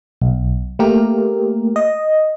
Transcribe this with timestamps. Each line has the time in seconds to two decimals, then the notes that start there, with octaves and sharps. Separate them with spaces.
0.22 B1
0.79 A3 A#3 G4 A#4
1.76 D#5